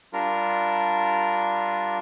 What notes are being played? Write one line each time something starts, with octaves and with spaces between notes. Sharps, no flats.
G3 D4 F4 A#4